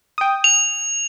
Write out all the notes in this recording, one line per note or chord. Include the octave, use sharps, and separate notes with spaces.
G5 D#6
F7